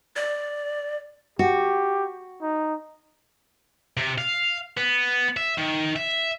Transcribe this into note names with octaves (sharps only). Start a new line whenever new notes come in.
D5
F#4 G4
D#4
C3
F5
B3
E5
D#3
E5